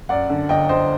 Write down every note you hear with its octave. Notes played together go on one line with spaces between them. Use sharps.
F#2 D5 F#5
D3
G1 D#5 G5
G1 C5 D#5